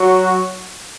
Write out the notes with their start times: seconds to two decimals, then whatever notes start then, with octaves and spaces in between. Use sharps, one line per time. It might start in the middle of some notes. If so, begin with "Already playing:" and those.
Already playing: F#3 F#4